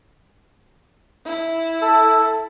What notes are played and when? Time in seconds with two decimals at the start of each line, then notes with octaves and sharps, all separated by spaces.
1.25 E4
1.82 A4